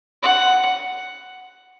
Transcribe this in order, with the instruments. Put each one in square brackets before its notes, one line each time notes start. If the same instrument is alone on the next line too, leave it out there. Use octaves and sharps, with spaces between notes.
[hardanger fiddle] F#5